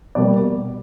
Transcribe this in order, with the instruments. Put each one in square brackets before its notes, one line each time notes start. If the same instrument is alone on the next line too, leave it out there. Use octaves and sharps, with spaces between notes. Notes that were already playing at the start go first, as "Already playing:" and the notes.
[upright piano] B2 G3 A#3 D5